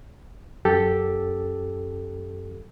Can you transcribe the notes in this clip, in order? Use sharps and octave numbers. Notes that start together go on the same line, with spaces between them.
F#2 G4 A4